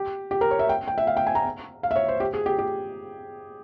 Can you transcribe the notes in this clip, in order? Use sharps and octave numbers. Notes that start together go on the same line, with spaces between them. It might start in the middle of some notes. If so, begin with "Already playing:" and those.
Already playing: G4
G4
A#4
C#5
E5
G5
G5
E5
F5
G5
G#5
A#5
F5
E5
C#5
C5
G4
G#4
G4
G4